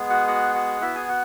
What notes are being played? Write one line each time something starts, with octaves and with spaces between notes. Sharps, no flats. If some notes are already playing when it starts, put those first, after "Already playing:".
Already playing: G#3 B3 G#4
F#4 F#5
F#4 F#5
F#4 F#5
B3 E4 F#4 E5
G#4 G#5
F#4 F#5